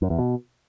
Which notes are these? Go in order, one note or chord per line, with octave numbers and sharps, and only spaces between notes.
F#2
E2
B2